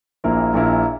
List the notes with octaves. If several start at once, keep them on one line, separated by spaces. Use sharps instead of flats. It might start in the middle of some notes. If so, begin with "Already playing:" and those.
A#1 A#2 A#3 E4 A#4
A#1 A#2 A#3 E4 A#4